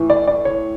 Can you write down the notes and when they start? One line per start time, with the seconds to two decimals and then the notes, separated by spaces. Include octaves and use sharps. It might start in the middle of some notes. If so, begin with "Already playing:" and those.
Already playing: A2 E3
0.10 D5
0.27 D5
0.45 C#5